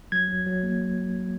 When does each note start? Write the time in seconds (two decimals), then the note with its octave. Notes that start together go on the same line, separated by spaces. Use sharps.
0.12 F#3 G#6
0.29 F#3
0.46 F#3
0.63 A#3